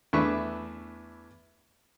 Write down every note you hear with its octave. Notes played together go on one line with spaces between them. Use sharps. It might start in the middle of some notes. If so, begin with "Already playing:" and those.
E2 A3 D4 B4 E5 C#6